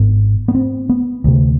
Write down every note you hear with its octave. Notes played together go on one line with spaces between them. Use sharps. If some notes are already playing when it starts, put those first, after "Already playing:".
Already playing: G#1 G#2 B3
B3
C4
B3
D2 C3